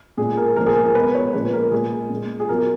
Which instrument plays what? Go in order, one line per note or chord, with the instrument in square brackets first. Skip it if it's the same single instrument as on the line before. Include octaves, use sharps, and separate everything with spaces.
[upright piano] A#2 G#3 G#4
G#4
A#4
A#2 F3 G#3 A#4
G#4
A#4
A#4
B2 G#3 B4
C#5
A#2 F3 G#3 B4
A#4
A#2 G#3 G#4
A#2 G#3
G#4
B2 F#3 A#4